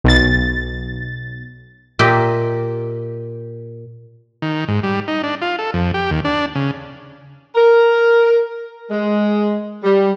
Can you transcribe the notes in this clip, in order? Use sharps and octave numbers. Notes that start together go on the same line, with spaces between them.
B1 A6
A#2 G4 D#5 E5 G5
D#3
G#2
G3
D#4
D4
F4
A4
F2
G4
D#2
D4
C#3
A#4
G#3
G3